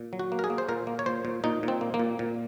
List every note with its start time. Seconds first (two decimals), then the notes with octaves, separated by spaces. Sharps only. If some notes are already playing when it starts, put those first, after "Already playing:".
Already playing: A#2
0.13 F#3
0.19 F#4
0.32 A#3
0.39 A#4
0.44 G#4
0.50 A#3
0.58 C5
0.69 A#2 A#4
0.87 A#3
0.99 C#5
1.06 A#2 C5
1.25 A#2
1.44 A#2 D#4
1.63 A#2
1.68 C4
1.81 A#3
1.94 A#3
1.99 A#2
2.19 A#2